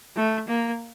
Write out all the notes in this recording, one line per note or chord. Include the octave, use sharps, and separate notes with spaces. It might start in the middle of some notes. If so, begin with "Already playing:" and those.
A3
A#3